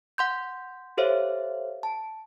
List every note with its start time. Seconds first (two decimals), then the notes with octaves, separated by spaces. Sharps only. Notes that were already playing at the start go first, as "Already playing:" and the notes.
0.18 F#5 C6 G6
0.97 G4 A4 C5 C#5 E5 F5
1.83 A5